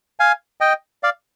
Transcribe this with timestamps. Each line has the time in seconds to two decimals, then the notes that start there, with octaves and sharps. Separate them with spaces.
0.20 F5 G#5
0.61 D#5 G5
1.03 D5 F5